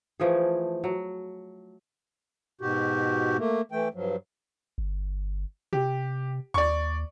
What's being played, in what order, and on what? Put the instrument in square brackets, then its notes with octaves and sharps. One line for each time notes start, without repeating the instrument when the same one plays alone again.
[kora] E3 F3 A3 G#4
F#3
[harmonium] G#2 B2 F#4 G4
A3 A#3
E3 A3 G5
G2 F3 F#3
[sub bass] G1
[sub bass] C3 [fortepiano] G4
[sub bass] D#2 [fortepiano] D5 C#6